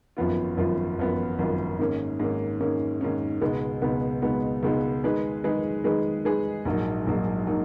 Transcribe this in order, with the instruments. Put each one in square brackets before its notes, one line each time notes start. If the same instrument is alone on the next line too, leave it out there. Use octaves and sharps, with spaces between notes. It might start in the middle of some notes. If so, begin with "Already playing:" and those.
[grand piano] G#1 F#2 F3 B3 F4
G#1 F#2 F3 B3 F4
G#1 F#2 F3 B3 F4
G#1 F#2 F3 B3 F4
G#2 D#3 A#3 C#4
G#2 D#3 A#3 C#4
G#2 D#3 A#3 C#4
G#2 D#3 A#3 C#4
C#2 B2 G#3 B3 D#4
C#2 B2 G#3 B3 D#4
C#2 B2 G#3 B3 D#4
C#2 B2 G#3 B3 D#4
D#3 G#3 D#4 G#4 B4
D#3 G#3 D#4 G#4 B4
D#3 G#3 D#4 G#4 B4
D#3 G#3 D#4 G#4 B4
A#1 G#2 F#3 A#3 D#4
A#1 G#2 F#3 A#3 D#4
F#3 A#3 D#4